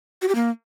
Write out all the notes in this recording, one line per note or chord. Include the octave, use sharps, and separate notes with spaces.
F#4
G4
A#3